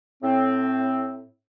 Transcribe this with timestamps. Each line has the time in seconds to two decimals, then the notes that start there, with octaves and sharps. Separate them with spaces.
0.22 A2 C4